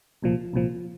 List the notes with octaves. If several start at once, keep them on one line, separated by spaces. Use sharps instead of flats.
C2 A#2 F3
C2 A#2 F3